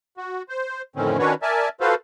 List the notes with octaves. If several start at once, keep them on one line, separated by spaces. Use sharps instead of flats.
F#4
C5
F2 A2 D3 D#3 C4 C#4
D#3 C#4 D4 F#4 B4 C#5
A#4 D5 E5 G#5 A5
F4 F#4 A4 B4 C5 F5